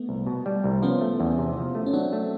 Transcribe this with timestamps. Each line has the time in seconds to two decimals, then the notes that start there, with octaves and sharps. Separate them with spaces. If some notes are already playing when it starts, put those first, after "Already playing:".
Already playing: A3 B3
0.09 C2
0.27 B2
0.46 G3
0.64 C2
0.82 F3 B3 C#4
1.01 A3
1.20 E2
1.38 C3
1.57 F3
1.75 A3
1.86 C#4
1.93 F#3 C4 D4
2.13 A3